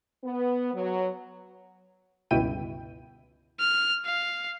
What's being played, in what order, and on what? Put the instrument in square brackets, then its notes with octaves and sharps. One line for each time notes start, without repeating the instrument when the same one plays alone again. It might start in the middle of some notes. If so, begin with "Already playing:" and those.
[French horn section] B3
F#3
[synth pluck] G1 C#2 B2 E4 G5 D#7
[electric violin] F6
F5